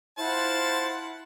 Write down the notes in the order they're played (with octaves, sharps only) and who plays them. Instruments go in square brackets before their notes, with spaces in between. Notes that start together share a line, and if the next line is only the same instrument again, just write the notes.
[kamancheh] E4 F#5 [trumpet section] F4 C5 [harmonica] A5